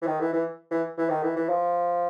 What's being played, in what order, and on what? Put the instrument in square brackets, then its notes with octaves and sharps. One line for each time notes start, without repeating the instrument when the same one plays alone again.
[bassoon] E3
D#3
E3
E3
E3
E3
D#3
E3
E3
F3